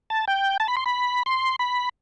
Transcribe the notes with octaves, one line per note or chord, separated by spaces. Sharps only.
A5
G5
A5
B5
C6
B5
C6
B5